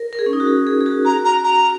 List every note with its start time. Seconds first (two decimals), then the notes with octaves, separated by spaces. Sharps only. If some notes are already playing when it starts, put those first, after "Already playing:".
Already playing: A#4
0.13 A#4
0.19 G#4
0.26 C#4
0.33 D#4
0.40 F#4
0.47 G#4
0.67 G#4
0.81 G#4
0.86 F#4
1.05 F#4 A#5
1.25 A#5
1.44 A#5